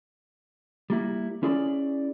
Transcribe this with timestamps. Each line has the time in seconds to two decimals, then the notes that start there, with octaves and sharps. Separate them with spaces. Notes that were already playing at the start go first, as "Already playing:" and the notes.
0.90 G3 A#3 E4
1.43 C#4 E4 G#4 D5 B5